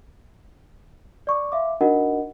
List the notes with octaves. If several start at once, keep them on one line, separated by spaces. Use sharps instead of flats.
D5 C#6 D6
E5 F5 C6 D6
D4 D#4 F#4 A#4 D#5 F#5